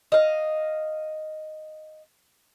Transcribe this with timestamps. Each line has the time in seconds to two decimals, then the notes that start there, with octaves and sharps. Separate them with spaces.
0.12 D#5 F5